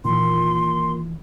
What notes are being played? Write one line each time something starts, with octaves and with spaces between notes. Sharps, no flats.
A#2 D#3 E3 C6